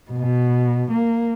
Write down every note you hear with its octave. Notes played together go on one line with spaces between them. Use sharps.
B2
A#3